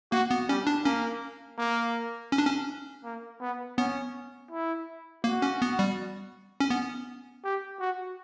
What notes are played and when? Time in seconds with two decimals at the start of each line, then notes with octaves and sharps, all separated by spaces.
0.12 A#3 F#4
0.31 B3
0.49 G3 C#4
0.67 D4
0.85 A#3 C#4
1.58 A#3
2.32 C#4
2.38 D4
2.46 C#4
3.04 A#3
3.41 B3
3.78 B3 C#4
4.52 E4
5.24 A#3 F#4
5.42 C#4
5.62 B3
5.79 G3
6.60 C#4
6.70 B3
7.44 G4
7.80 F#4